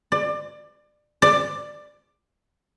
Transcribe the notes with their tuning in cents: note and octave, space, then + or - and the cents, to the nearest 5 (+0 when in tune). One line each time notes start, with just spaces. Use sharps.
D5 +25
D5 +15